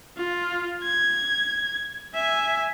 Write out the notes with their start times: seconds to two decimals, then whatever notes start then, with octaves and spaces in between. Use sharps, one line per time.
0.17 F4
0.83 G#6
2.15 E5 G#5